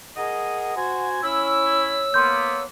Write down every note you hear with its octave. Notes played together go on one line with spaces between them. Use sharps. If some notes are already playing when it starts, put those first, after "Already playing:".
G#4 A#4 D#5 F#5
F#4 C5 G#5
C#4 E4 C#5 E6
A#3 B3 C6 G6